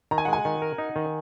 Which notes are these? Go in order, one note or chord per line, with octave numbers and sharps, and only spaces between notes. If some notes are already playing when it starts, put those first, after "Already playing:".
D#3 A#5
G#5
F#5
G#3 G#5
D#3
A#4
D#4
D#3